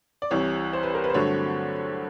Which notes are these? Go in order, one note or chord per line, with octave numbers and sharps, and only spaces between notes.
D5
C2 C3 E3 C#5
C5
B4
A#4
B4
C5
G2 D3 F#3 A3 C4 C#5